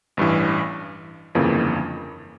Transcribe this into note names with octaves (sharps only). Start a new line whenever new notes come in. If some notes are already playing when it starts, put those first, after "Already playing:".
A1 G2 E3
G1 F2 C#3 E3 A#3